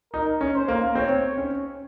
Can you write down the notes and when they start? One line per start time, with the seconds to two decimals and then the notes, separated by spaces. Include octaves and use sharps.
0.13 D#4 A#4
0.41 C#4
0.55 C5
0.68 A#3
0.95 C4 C#5
1.37 C#4